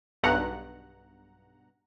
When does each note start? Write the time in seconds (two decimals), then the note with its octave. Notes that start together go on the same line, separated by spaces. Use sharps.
0.23 B1 G2 F#5 A#5